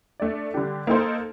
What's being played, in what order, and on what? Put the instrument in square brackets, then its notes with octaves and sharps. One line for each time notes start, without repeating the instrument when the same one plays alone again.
[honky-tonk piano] A3 D4 A4 D5
D3 G3 D4 G4
A#3 D#4 A4 C5